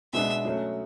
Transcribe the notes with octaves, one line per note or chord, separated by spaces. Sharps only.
B2 G#3 B3 D4 E5
F#3 A3 C#4